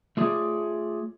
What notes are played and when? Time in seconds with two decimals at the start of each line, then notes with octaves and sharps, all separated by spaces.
0.17 A3 F4 G#4 C#5 D5